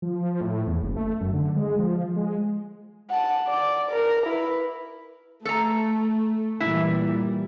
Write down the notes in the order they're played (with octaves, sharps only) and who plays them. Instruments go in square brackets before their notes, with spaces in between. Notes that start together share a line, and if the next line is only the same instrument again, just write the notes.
[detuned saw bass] F3
A2
E2
F#1
A3
F#2
D3
G#3
F3
G#3
[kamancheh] F#5 A5
D5
A#4
E4 B4
[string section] A3 [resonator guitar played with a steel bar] A4 A#5
[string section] A#2 E3 G3 [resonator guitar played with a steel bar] E4